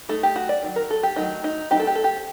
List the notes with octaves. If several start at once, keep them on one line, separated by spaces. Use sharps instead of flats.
A3 D#4 A4
G4
F#4
D5
D#3 F#3
A#4
A4
G4
D#3 F#3 A3 D#4
D#4
F#3 A3 C4 D#4 G4
A4
G4
A4
G4